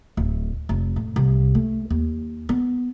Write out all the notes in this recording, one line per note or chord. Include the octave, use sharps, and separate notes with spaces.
D1
F1
A2
C2
A3
D#2
B3